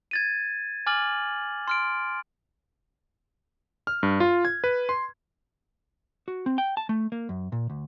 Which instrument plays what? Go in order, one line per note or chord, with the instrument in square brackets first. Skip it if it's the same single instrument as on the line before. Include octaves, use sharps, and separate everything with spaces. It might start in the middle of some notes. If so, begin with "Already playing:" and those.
[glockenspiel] G#6 A6 D#7
G#5 D6 F6 A6 F#7
C6 F6 D7
[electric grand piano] F6
G2
F4
G#6
B4
C6
[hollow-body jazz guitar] F#4
C4
G5
A5
A3
A#3
F#2
A#2
D2